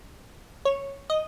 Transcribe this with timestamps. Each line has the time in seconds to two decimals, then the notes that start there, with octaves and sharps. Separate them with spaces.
0.65 C#5
1.10 D#5